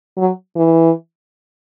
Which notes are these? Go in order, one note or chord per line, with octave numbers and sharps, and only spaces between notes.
F#3
E3